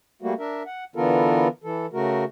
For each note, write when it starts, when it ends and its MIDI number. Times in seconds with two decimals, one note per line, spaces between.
0.22 0.34 55
0.22 0.34 57
0.22 0.34 58
0.22 0.34 66
0.39 0.63 62
0.39 0.63 70
0.39 0.63 76
0.66 0.84 78
0.96 1.48 50
0.96 1.48 52
0.96 1.48 59
0.96 1.48 65
0.96 1.48 69
0.96 1.48 70
1.64 1.86 52
1.64 1.86 69
1.93 2.24 49
1.93 2.24 57
1.93 2.24 66
1.93 2.24 70